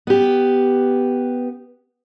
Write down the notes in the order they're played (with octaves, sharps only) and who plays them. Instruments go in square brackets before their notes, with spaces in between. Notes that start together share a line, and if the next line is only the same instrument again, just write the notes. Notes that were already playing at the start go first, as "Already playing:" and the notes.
[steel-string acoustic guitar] B3 G4